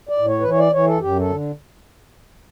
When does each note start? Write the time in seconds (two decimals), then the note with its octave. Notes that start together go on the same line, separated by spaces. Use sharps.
0.09 D5
0.18 A2
0.27 C#5
0.40 B4
0.45 E3 C#5
0.59 D5
0.72 E3 C#5
0.86 A4
1.00 F#2 G4
1.19 A4
1.29 D3